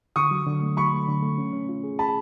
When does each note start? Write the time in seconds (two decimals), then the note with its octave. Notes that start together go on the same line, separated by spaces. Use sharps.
0.16 D3 C#6 D#6
0.31 F#3
0.46 D3
0.61 A3
0.77 F#3 B5 C#6
0.93 A3
1.08 D3
1.23 A3
1.38 C#4
1.53 C#4
1.69 F4
1.84 G#4
1.99 G#4 A5 B5